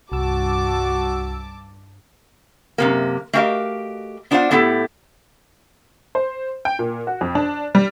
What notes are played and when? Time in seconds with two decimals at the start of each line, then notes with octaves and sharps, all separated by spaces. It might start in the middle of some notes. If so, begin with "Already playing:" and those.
0.12 C2 G2 F#4 A5 D6 E6
2.78 F#2 C3 A#3
3.33 A3 F#4 G4 A#4 D#5 F5
4.31 B3 D4 F4 C5 F5 F#5
4.51 A2 B3 E4 G4 A4
6.15 C5
6.65 G5
6.79 A#2
7.07 F#4
7.21 F2
7.35 D4
7.75 G3